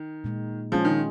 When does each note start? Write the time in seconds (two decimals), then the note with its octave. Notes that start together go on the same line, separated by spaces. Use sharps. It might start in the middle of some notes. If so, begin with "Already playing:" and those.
Already playing: D#3
0.24 A#2 G#3 D#4
0.72 F3 G#3 C#4 F4 G#4
0.85 D#3